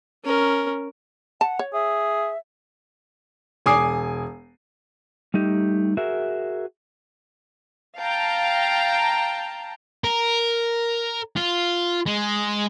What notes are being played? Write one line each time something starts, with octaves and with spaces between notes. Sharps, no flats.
C#4 A#4
F#5 A5
C#5
G#4 E5
E1 G#5 D6 D#6 C7
G3 A3 D#4 G4
F#4 G#4 A#4 E5
F5 G5 A5 A#5
A#4
F4
G#3